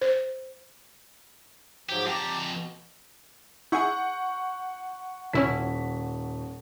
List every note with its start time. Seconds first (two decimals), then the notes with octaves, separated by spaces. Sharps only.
0.01 C5
1.89 G#2 F3 F#3 G4
2.07 F2 G4 A5 A#5
2.51 B2
3.72 E4 G#4 F#5 C#6 G6
5.33 D#1 C#4 E4 F#4 B6